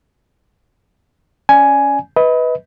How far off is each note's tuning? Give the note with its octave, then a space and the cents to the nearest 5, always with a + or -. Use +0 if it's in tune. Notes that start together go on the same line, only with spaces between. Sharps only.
C#4 +0 D5 +0 G#5 +10
B4 +0 D#5 +35